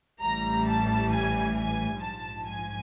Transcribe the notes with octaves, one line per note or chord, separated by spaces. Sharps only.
A1 A2 E3 G3 A#5
A5
G#5
G#5
A#1 G#2 F3 A5
G#5